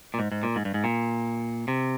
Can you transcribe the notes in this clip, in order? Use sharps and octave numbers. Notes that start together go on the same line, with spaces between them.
A#2
G#2
G#2
A#2
G#2
G2
G#2
A#2
C3